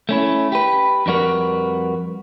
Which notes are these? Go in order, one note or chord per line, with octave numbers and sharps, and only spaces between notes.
A3 C#4 E4
G4 B4
F2 G3 D#4 F#4 A#4 B4